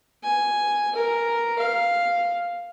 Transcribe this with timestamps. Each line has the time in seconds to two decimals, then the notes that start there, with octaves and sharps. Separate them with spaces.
0.24 G#5
0.95 A#4
1.59 F5